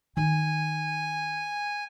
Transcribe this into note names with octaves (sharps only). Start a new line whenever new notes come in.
D#3 D#4 G#5